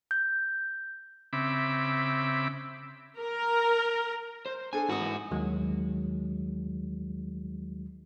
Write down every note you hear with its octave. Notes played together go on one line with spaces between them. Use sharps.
G6
C#3 C4 E5 B5 D6
A#4
C5
D4 G#4 A4 G#5
G#2 D#4 F#4 D#6
E3
D#2 D#3 F#3 G#3